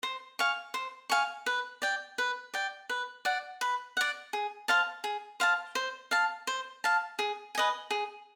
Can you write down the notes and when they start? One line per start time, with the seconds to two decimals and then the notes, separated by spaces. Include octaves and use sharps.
0.03 C5
0.39 F5 G#5 C#6
0.74 C5
1.10 F5 G#5 C#6
1.46 B4
1.82 D5 G5
2.18 B4
2.54 D5 G5
2.89 B4
3.25 D5 F#5
3.61 B4
3.97 D5 F#5
4.33 G#4
4.68 C5 F5 A5
5.04 G#4
5.40 C5 F5 A5
5.75 C5
6.11 F5 A5
6.47 C5
6.84 F5 A5
7.19 G#4
7.55 B4 D#5 G#5
7.90 G#4